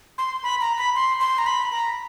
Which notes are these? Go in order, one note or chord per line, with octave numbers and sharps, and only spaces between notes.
C6
B5
A#5
B5
C6
C6
A#5
B5
A#5